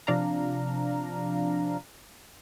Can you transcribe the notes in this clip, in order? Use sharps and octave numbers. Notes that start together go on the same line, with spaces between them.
C3 F3 D4 F5 A#5